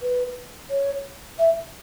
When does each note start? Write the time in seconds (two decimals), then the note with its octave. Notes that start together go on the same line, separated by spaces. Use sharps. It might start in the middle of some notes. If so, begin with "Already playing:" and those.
0.02 B4
0.70 C#5
1.38 E5